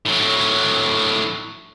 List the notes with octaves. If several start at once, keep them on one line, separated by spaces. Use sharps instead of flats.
A2 F#3